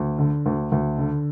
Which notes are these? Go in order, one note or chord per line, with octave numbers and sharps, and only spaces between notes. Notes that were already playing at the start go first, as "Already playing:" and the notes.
Already playing: D2
D3
D2
D2
D3